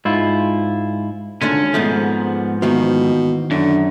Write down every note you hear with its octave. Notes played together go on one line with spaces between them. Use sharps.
G#2 E4 F4
G#1 A#2 D3 C#4 D4
G#2 F3 G#3 A3 B3
B2 D#3 E3 A#3
F#2 D3